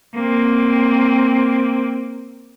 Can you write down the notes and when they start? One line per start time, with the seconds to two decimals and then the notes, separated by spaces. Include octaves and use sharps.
0.15 A#3 C4